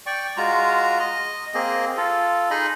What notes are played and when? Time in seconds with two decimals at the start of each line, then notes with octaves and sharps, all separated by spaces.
0.06 D5 G5 C#6
0.37 G#3 F4 F#4 A#5
0.99 D#5
1.54 A#3 C4 G#4 D#5
1.97 F4 A4
2.50 D#4 G#4 D#5 B5